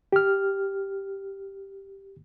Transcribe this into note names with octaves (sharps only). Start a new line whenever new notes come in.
G4 F6